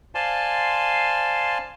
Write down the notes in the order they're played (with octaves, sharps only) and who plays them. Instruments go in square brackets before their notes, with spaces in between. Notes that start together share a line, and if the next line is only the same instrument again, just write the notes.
[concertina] C5 D5 F5 G#5 A5 C6